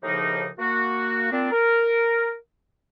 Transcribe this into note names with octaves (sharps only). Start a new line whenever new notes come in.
D#2 A2 C#3 F3 A#3 D#4
A#3 F#4
A#2 C4 D4
A#4